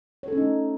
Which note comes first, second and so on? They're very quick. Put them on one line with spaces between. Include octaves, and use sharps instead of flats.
C#5 A4 C#4 D#4 A3